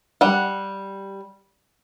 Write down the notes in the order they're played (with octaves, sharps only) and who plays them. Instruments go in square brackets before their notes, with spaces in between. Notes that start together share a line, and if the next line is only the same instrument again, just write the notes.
[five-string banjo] G3 F#5